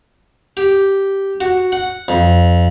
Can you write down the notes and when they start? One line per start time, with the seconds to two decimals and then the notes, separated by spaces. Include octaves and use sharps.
0.57 G4
1.41 F#4
1.72 F#5
2.08 F2